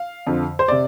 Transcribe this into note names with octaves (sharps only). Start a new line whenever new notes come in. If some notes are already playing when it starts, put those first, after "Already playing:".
Already playing: F5
F2 D3
C5
C3 D5